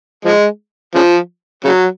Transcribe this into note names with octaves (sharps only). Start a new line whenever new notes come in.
F3 G#3
C#3 F3
C#3 F#3